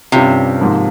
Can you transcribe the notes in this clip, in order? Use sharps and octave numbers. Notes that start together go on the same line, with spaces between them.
G2 C3 G3 C#4 F4
G#2 F3 A#3